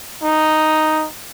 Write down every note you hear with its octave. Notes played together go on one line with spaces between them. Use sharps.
D#4